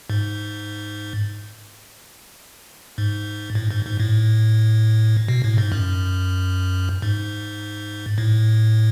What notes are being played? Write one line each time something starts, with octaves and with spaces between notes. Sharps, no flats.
G#2
G#2
A2
G#2
G#2
A2
B2
A2
G#2
F#2
G#2
A2